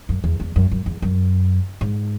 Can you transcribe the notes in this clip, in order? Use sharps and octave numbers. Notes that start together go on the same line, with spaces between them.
F#2
E2
E2
F#2
F#2
E2
F#2
G#2